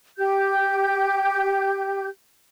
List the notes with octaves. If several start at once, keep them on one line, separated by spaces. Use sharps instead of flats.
G4 G6